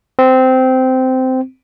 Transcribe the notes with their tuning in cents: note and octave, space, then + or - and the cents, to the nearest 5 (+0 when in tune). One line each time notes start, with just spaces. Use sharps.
C4 -15